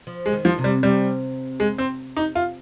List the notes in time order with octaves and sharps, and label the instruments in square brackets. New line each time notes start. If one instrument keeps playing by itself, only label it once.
[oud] F3
[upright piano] G#3
[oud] D#3
[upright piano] F3
[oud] C3
[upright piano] G3
[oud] C3 [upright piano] G3
[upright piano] G#3
C4
D#4
F4